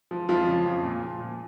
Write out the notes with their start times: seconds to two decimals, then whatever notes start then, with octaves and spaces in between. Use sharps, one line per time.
0.11 F3
0.29 F2 F3 F4
0.47 C#3
0.65 F2
0.83 A#2
1.02 F3
1.20 A#2